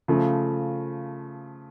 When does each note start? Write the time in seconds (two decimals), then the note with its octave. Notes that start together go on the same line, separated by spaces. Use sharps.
0.08 C#3 F3 A3